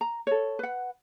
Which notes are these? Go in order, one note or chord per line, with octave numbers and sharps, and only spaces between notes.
A#5
A4 C#5
B4 F#5